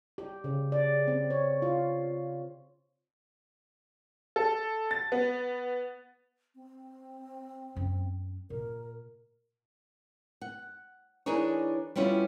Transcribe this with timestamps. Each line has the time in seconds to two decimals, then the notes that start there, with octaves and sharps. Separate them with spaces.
0.18 G4
0.44 C#3
0.72 D5
1.08 C4
1.30 C#5
1.62 F4
4.36 A4
4.91 A6
5.12 B3
6.55 C4
7.76 F#2 B3
8.50 A#2 A#4
10.41 F#5
11.26 E3 D4 D#4 G#4 A#4 C#5
11.96 G3 B3 C#4 E4 F4